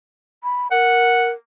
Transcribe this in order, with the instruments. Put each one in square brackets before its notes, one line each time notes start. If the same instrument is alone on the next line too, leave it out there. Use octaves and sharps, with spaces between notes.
[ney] B5
[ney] A#4 [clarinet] F#5